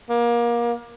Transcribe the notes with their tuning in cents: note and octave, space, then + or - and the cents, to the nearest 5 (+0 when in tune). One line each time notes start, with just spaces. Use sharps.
A#3 +25